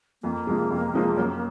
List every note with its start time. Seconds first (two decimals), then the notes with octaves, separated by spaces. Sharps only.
0.23 F2 A#3
0.47 C3 F3 G#3
0.70 F2
0.94 C3 F3 G#3
1.17 F#2